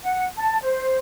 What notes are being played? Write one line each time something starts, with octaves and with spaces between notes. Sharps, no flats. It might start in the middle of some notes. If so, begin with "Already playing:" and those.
F#5
A5
C5